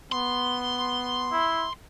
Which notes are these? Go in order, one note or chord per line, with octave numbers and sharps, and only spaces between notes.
B3 C6
E4